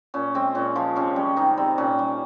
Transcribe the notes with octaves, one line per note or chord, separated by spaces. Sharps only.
A#2 C#4
G#3 C4
A#2 C#4
F3 G#3 F4
C3 C#4
G3 C#4
C3 D#3 D#4
G3 C4
A#2 C#4
G3